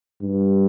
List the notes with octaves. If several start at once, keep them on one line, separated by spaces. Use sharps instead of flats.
G2